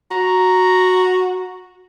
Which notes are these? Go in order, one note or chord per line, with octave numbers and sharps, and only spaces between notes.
F#4 A#5